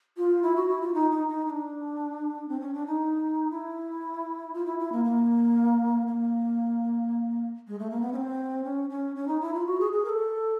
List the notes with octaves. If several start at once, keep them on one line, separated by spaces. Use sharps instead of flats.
F4
E4
F#4
E4
F4
D#4
D#4
D#4
D#4
D4
C4
C#4
D4
D#4
E4
F4
E4
E4
A#3
A#3
A#3
G#3
A3
A#3
B3
C#4
C4
C#4
C#4
C#4
D#4
E4
F4
F#4
G#4
G#4
A#4
A4